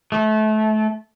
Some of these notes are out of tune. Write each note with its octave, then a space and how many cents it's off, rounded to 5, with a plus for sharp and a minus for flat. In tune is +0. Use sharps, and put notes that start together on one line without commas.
A3 -25